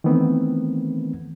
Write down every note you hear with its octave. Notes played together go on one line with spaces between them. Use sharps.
D#3 E3 A3 B3 C4